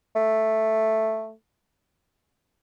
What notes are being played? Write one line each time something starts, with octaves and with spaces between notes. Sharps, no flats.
A3